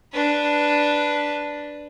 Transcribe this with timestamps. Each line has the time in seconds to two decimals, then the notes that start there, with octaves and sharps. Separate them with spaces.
0.13 D4 B4